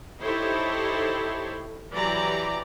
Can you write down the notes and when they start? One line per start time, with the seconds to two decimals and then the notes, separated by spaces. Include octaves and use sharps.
0.20 D#4 E4 G4 A4 C5 C#5
1.92 E3 F#3 G4 D5 A#5